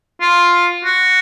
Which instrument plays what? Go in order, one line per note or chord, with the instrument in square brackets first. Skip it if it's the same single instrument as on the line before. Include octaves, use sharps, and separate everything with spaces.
[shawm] F4
F#4